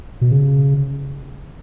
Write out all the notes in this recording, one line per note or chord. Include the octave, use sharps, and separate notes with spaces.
B2
C#3